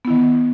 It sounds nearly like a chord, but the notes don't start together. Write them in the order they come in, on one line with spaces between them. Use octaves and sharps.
B3 E4 D#3